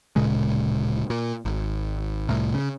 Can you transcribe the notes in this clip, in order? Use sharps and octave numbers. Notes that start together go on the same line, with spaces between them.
D1 A#2 C#3 G#3
A#2
G#1
C2 A2
C#3